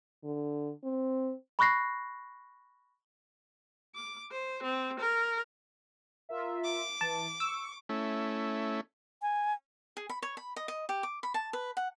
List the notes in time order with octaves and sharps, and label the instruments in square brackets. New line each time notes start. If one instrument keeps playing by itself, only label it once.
[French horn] D3
C4
[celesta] B5 C#6 F#6 A#6 C7
[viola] D6
C5
C4
A#4
[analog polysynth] F4 A#4 E5
[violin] D6
[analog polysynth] E3 [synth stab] A5
[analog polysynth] C#6 [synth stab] E6
[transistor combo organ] A3 C#4 E4
[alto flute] G#5
[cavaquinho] G#4
B5
C#5
B5
D#5
D#5
G4
D6
B5
A5
B4
F#5